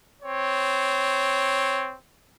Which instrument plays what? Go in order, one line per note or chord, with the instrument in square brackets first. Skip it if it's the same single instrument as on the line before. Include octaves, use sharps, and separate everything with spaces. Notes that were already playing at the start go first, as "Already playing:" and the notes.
[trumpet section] C4 C#5